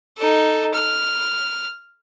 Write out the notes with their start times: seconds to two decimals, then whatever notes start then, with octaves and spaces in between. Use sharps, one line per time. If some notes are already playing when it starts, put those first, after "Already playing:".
0.18 D#4 A4
0.74 F6